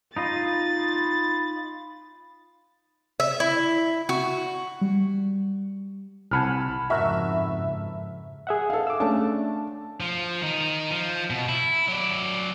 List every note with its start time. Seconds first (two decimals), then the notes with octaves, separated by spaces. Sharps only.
0.17 D#4 F4 D#5 B5 A6
3.20 E5
3.40 E4
4.09 F#4
4.81 G3
6.31 C2 F#5 G#5 A5 B5 F6
6.90 F2 G#2 C#3 F#4 A#4 E5
8.47 G#4 E5 F#5
8.70 A4 F5
8.87 D6 E6
9.00 A3 C#4 D4 A5
10.00 F3
10.42 D#3 D#4
10.91 F3
11.30 B2
11.49 E4
11.88 F#3 D5